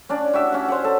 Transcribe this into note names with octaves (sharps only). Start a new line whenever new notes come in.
C#4 D4 D5
F#4 G4 E5
C#4 F#5
C5 C#5 F#5
A4